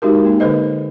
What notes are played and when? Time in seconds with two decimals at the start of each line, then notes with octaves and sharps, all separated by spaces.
0.02 G#3 D#4 F#4 G4 A#4
0.25 A#3 D#4
0.40 D3 A4 B4 C5 D#5